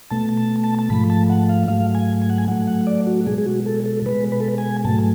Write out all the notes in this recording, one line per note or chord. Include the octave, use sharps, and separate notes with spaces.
B2 A3 A5
A5
A5
A5
G#2 F3 A3 B5
A5
F#5
F5
G#2 F#3 A3 F5
G#5
G#5
F#5
G#5
A2 F#3 A3 F#5
F#5
D5
F#4
B2 G#3 G#4
G#4
F#4
A4
A4
B2 G#3 B4
B4
A4
B4
G#5
G#2 F#3 A3 A5